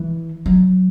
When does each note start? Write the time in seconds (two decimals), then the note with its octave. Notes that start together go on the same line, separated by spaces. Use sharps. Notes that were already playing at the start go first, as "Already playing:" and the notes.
Already playing: E3
0.46 F#3